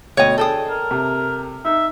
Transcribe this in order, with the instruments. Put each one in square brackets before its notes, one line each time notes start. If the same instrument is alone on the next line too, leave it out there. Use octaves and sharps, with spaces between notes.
[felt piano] D2 B2 G5 [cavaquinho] C#5 D#5
[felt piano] D4 G#4 [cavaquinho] A4 G5 D#6
[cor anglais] A#4
[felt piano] C3
[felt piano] D#4 [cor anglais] E5